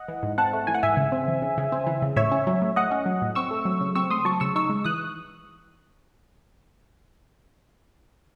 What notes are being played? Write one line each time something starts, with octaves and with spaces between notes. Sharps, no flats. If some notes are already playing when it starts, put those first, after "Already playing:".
Already playing: D#5 F#5
E3
G#2
C4 F#5 A5
A3
E3 G#5
F#5
G#2 E5 G#5
C#3
C4
E3
C#3
C#3
C4
E3
C#3
A2 C#5 E5
C#4
F#3
A2
A2 D#5 F#5
C#4
F#3
A2
C4 C#6 E6
A3
F#3
C#3
C4 C#6 E6
A3 C6 D#6
F#3 A5 C#6
C#3 C#6 E6
D#4 C#6 E6
G#3
E3 D#6 F#6